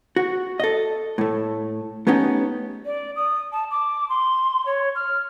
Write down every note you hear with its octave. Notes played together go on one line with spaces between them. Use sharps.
F#4
A4 D#5
A2 A3
A3 B3 C#4 D#4 G4
D5
D#6
A5
D6
C6
C#5
F6